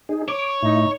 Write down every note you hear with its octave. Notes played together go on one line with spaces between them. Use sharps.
D#4 G#4
C#5 D6
A2 D#4 E4